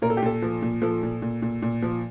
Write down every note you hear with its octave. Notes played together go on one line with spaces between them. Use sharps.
A#2 A#4
A4
G4
A#2 A4
F3
A#2
F3 A4
A#2
A#2
A#2
A#2
F3